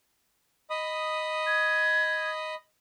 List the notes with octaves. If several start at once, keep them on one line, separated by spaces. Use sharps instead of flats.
D#5 B5 D#6
G#6